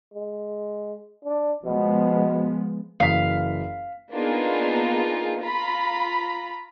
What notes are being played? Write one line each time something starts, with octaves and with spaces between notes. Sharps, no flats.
G#3
D4
B2 F3 G#3 B3
F#1 E3 F5 B6
A#3 B3 D4 D#4 F4 G#4
F4 A#5 B5